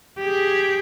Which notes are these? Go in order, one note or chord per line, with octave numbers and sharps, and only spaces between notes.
G4 G#4